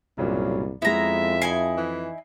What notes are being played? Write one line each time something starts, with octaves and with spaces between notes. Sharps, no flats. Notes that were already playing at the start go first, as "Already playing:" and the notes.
C2 G2 A#2 C#3 F#3
F2 G#3 B3 E4 E5 A#5
D#4 E4 G#5 C7
E3